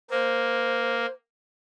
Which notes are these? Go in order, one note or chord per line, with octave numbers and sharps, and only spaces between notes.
A#3 C5